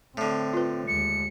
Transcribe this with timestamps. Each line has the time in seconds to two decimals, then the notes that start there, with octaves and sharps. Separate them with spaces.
0.17 A2 D3 C4
0.53 F4 B4
0.88 D#2 G#3 C#7